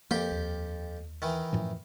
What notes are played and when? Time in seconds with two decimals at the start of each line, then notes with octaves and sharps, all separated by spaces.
0.11 F2 A#3 G4 G5
0.32 D#2
1.22 D#3 E3
1.53 F#2 A2 F3